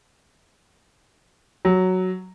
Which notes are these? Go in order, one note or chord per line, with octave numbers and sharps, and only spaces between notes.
F#3